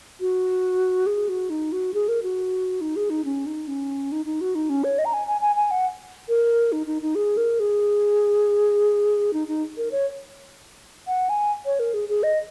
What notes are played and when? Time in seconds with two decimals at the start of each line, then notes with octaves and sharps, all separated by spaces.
0.21 F#4
1.06 G#4
1.29 F#4
1.50 D#4
1.72 F#4
1.94 G#4
2.08 A#4
2.23 F#4
2.81 D#4
2.96 G#4
3.10 D#4
3.25 C#4
3.46 D#4
3.68 C#4
4.12 D#4
4.26 D#4
4.41 F#4
4.55 D#4
4.69 C#4
4.84 C#5
4.98 D#5
5.05 A#5
5.13 G#5
5.28 G#5
5.41 G#5
5.56 G#5
5.71 F#5
6.29 A#4
6.72 D#4
6.87 D#4
7.02 D#4
7.15 G#4
7.37 A#4
7.60 G#4
9.33 D#4
9.48 D#4
9.77 A#4
9.91 C#5
11.07 F#5
11.29 G#5
11.66 C#5
11.80 A#4
11.94 G#4
12.09 G#4
12.23 D#5